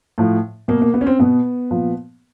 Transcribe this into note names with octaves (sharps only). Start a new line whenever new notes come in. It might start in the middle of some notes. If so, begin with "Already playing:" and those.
A2 F3
B2 A#3
A#3
B3
C#4
C4
B2 B3
A#2 F3